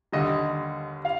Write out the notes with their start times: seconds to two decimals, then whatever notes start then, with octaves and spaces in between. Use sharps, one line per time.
0.12 D#2 D3 G3 D#5
1.05 F5